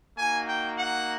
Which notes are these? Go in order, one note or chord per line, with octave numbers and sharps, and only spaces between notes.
A#3 D#4 F#4 G#5
G5
F#5